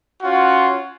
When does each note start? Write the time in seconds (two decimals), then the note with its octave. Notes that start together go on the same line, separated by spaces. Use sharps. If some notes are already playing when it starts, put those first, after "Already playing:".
0.22 C#4 F4 F#4